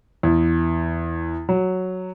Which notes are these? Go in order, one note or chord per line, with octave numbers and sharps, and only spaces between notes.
E2
F#3